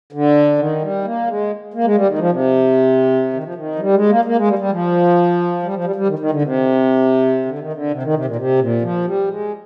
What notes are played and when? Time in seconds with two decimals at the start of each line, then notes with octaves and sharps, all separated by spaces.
0.12 D3
0.59 D#3
0.82 G3
1.05 A#3
1.28 G#3
1.74 A#3
1.84 G#3
1.95 G3
2.08 D#3
2.18 F3
2.30 C3
3.33 D#3
3.44 F3
3.55 D#3
3.75 F3
3.79 G3
3.95 G#3
4.09 A#3
4.25 A#3
4.37 G#3
4.48 G3
4.59 G3
4.71 F3
5.63 G3
5.73 F3
5.84 G3
5.96 G3
6.08 D#3
6.19 D#3
6.31 D3
6.42 C3
7.45 D3
7.59 D#3
7.73 D3
7.91 C3
8.03 D#3
8.14 C3
8.25 A#2
8.36 C3
8.59 A#2
8.82 F3
9.05 G3
9.28 G#3